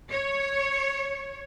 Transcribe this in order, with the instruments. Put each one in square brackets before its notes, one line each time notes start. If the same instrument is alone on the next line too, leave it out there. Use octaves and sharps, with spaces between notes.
[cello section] C#5